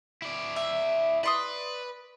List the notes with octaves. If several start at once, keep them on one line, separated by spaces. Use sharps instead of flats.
E4 D5
E5
B4 D5 C6 D#6